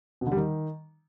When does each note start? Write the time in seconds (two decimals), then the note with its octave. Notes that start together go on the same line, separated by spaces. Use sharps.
0.21 B2
0.26 D3
0.32 G3
0.37 D#3